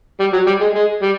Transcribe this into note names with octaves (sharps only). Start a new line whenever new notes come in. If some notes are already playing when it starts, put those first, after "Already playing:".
G3
F#3
G3
G#3
G#3
G3